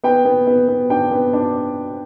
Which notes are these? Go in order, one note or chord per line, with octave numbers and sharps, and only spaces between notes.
B3 G5
B3
B3
B3
D4 G5
B3
D4